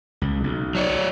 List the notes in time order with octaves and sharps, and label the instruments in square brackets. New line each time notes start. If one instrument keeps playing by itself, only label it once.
[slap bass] C#2
B1
[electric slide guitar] F#3 C#5 D5